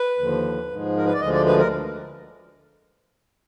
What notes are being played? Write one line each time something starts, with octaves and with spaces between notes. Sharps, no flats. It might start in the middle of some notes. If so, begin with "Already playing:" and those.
Already playing: B4
D#2 D3 F3
G#2 F3 G#3
A#4
B4
D5
D2 D3 F3 G#3 D#5
D5
B4
A#4